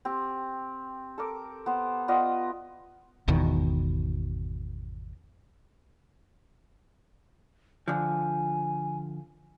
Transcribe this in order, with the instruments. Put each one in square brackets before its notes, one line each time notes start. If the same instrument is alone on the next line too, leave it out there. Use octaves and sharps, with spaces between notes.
[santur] C4 G4
A4 A#4 D6
B3 C5
B3 F4 D5 D#5
[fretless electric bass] G#1 E2 B2 D#3
[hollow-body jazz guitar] D3 F3 [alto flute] G#5